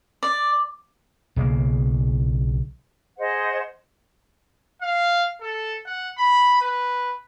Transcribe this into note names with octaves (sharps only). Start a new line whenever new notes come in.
D5
B1 C#3 F#3 A#3
G#4 C5 D#5 F#5
F5
A4
F#5
B5
B4